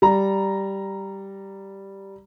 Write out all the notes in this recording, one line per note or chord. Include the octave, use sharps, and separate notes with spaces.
G3 A#5